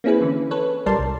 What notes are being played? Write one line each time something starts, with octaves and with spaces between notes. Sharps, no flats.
A#3 C4 C#4 E4 G#4 B4
D3 E3 C#4
A4 B4 C#5
A#1 G3 A#4 D5 A5 C6
C2